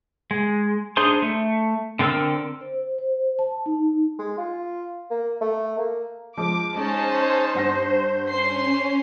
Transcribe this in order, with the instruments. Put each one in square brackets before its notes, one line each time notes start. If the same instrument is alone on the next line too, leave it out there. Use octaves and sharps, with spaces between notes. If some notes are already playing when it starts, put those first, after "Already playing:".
[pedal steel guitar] G#3
D4 D#4 G#4 C5 C6
A3
D3 C4 A4 A#4 E6
[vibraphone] C5
C5
A5
D#4
[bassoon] G#3
F4
A#3
A3
A#3
[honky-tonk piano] F3 G#3 [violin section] D6
[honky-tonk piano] G#3 [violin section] C#4 D#4 A5 [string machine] C5
[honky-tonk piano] G2 F#5 A#6
[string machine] C#4 [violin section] C5 C6 C7